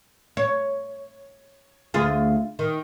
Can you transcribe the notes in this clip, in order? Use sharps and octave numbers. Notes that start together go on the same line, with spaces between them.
C#5
D2 F4 G#4
D#3